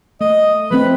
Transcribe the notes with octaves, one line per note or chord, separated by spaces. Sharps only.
A3 D#5
F3 A3 C4 B4